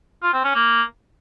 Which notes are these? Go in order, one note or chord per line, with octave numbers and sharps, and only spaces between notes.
F4
C4
C#4
A#3